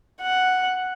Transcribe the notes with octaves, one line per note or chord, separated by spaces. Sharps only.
F#5